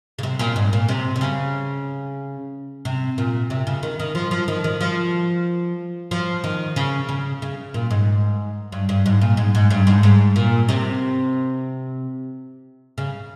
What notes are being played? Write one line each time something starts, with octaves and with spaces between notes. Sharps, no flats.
C#3
C3
A#2
G#2
A#2
C3
C3
C#3
C3
A#2
C3
C#3
D#3
D#3
F3
F3
D#3
D#3
F3
F3
D#3
C#3
C#3
C#3
A#2
G#2
G2
G2
G#2
A#2
G#2
G#2
G2
G#2
G#2
A#2
C3
C#3